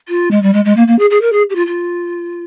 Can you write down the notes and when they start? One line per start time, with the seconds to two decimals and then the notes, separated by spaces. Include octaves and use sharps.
0.09 F4
0.31 G#3
0.43 G3
0.53 G#3
0.65 G#3
0.77 A#3
0.87 A#3
0.99 G#4
1.10 G#4
1.21 A#4
1.33 G#4
1.50 G4
1.55 F4
1.67 F4